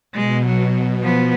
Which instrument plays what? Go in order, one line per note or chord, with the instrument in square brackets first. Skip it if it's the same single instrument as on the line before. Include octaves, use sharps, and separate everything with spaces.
[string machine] B2 [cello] G#3
[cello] F#3
F3 B3